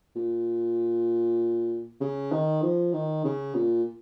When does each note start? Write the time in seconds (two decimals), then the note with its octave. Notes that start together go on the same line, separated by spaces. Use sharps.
0.16 A#2
2.01 C#3
2.32 D#3
2.62 F3
2.93 D#3
3.25 C#3
3.55 A#2